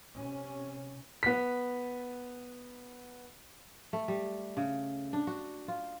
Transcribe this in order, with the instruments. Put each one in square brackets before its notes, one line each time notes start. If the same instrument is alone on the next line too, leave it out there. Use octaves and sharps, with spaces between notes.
[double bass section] C3 C#4
[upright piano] B3 B6
[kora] A3
G3
C#3
D4
F#4
F4